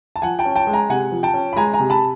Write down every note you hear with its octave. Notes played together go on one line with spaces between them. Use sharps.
A5
F3 F#5 G#5
G5 A5
C#4
G5 A5
G#3
G#5 A#5
C3 F#5 G#5
F3
G5 A5
C#4
B5
G#3 G#5 A#5
G#5 A#5
C3
A5 B5